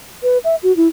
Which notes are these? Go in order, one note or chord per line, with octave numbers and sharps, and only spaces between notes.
B4
E5
F#4
E4